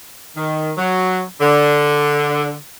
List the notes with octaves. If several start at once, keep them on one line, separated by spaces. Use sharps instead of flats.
D#3
F#3
D3